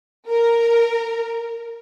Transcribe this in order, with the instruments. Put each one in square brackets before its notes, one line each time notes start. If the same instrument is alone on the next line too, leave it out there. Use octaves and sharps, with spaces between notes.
[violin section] A#4